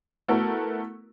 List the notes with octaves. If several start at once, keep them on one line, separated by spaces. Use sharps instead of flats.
A3 B3 E4 F#4 A4 A#4